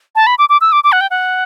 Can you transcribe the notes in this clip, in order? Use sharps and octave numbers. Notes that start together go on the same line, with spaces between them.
A5
B5
D6
D6
E6
D6
D6
F#5
G5
F#5